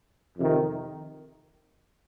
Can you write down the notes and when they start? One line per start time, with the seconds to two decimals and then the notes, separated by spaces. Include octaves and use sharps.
0.37 F2 C3 D#3